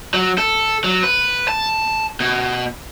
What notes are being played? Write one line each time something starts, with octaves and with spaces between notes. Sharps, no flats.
F#3
A4
F#3
B4
A5
B2